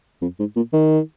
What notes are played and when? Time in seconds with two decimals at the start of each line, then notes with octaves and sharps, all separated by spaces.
0.21 F2
0.39 G#2
0.56 A#2
0.73 D#3